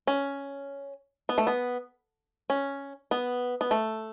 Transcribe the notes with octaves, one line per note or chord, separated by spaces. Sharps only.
C#4
B3
A3
B3
C#4
B3
B3
A3